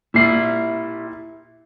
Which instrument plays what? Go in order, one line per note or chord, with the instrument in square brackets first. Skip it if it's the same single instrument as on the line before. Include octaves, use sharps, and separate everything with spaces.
[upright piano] A#2 C7 [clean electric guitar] E4 G4 E5